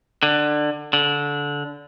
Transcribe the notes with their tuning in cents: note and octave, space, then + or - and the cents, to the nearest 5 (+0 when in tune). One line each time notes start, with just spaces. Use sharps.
D3 +20
D3 -20